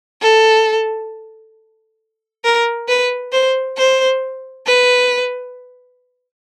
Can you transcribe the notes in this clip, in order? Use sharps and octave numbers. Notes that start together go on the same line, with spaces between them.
A4
A#4
B4
C5
C5
B4